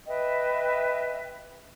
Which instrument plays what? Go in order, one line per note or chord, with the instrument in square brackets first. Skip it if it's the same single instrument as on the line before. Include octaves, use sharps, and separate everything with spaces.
[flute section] B4 D#5 E5 G5